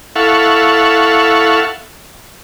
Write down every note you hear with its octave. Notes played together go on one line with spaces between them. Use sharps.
E4 A4 F5 F#5 C#6